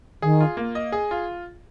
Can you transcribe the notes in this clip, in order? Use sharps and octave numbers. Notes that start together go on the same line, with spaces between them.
D#3 G#4
F4
A#3
D#5
G#4
F4